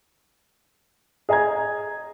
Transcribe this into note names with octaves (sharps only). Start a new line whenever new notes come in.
G#4 D#5 G#5 A#5 G#6